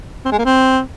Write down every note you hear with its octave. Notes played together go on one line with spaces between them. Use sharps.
C4
G#3
A#3
C4